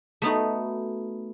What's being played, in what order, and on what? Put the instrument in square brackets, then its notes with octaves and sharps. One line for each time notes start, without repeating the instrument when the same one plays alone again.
[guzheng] A3 B3 D#4 F#4